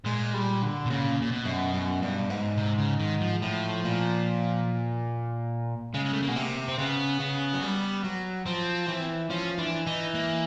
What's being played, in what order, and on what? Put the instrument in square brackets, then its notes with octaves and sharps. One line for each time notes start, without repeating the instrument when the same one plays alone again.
[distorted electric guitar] A#2 [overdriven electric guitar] G#3
[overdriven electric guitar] G3
D3
[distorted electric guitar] B2
[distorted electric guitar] A#2 [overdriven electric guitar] C#3
[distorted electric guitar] A#2
B2
[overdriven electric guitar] F#2
F#2
G2
G#2
[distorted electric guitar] C3
C#3
D#3
F3
[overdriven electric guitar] A2 [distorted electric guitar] F3
[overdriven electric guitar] A#2
[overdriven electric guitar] C#3 [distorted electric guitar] G#3
[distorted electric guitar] G#3
A3
A#3
[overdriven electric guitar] B2
C3
[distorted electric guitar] C4
[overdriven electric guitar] C#3 [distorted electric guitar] B3
[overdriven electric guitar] C#3
F#3
G3
F#3
[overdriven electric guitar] F3 [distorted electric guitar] C4
[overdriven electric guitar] E3
[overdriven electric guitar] F3 [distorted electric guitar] C#4
[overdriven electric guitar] E3 [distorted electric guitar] D4
[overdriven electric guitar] E3 [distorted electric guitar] D#4
[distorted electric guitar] A#3